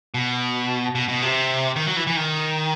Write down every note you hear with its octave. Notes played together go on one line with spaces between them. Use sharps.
B2
B2
B2
C3
D#3
F#3
E3
E3
D#3